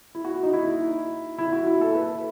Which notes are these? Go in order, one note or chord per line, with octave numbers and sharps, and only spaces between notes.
E4
F#4
D#4
E4
E4
F#4
E4
A4
B4